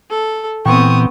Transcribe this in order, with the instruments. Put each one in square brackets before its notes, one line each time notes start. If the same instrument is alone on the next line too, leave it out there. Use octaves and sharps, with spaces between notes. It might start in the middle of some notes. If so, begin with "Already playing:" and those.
[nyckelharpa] A4
[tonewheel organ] A#2 E3 G5 [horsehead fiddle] B3 C4 [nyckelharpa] C#6 D#6